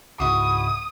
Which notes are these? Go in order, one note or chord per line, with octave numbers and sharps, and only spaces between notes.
C#2 G#2 E4 F#4 D#6